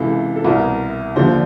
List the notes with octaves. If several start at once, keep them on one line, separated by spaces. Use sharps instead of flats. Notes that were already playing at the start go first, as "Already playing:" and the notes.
Already playing: C#2 C3 E3 A4
A4
C2 B2 A#4
D#2 D3 F3 C5